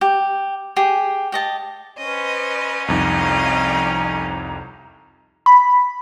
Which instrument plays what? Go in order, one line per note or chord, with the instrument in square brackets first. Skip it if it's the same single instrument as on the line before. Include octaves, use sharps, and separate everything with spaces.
[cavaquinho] G4
G4 G#4
G4 D#5 A5
[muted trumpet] C#4 [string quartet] B4 C5 D#5
[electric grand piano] C2 F2 D#4 [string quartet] D#5 F5 G5 [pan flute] A#5
[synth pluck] B5